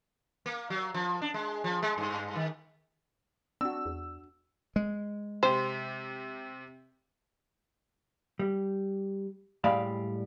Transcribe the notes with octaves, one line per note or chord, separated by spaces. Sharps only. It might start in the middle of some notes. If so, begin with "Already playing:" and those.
A#3
F#3
F3
D4
G#3
F3
G#3
G2
D#3
C4 D4 F#4 E6
E2
G#3
C3 G4 C5
G3
A2 G3 G#3 D5 F5 B5